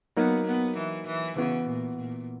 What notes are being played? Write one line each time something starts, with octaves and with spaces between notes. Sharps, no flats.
F#3 A#3 B3 D#4
B3
E3
E3
C#3 E3 B3 F#4
A#2
A#2